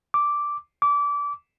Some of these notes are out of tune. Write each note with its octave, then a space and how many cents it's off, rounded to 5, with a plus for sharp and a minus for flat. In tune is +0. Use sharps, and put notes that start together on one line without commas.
D6 -5
D6 -25